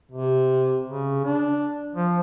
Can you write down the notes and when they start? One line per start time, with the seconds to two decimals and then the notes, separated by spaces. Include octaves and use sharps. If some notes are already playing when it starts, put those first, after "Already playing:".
0.12 C3
0.89 C#3
1.25 D4
1.96 F3